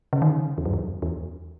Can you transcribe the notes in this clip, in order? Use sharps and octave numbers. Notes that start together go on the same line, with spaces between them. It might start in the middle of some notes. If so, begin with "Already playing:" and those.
C#3
D#3
C#3
E2
F#2
E2
E2